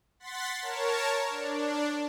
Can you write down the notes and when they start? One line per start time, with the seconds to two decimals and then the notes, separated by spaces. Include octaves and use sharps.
0.20 F#5 C6 A6 B6
0.62 A#4 C#5 A5
1.30 D4